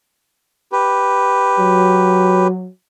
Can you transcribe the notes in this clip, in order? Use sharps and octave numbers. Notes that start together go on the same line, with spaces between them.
G4 B4
F#3